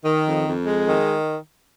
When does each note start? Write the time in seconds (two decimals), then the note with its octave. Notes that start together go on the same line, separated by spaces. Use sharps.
0.04 D#3
0.25 F2
0.45 F2
0.66 G#3
0.87 D#3